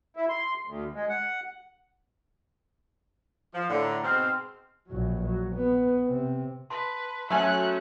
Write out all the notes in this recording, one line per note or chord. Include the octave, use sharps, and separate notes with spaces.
E4
C6
D2
G#3
F#5
F3
A2 D3
A#5
G#2 B2 C4 F6
A#1 F#3
F#3
B3
C3 C4
B4 A5 C6
F#3 A3 C#4 E5 G#5 F#6